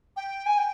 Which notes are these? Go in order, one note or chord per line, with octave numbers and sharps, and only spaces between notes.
G5
G#5
G5